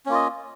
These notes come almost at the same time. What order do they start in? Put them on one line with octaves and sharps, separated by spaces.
C#4 A#3 F4 D#5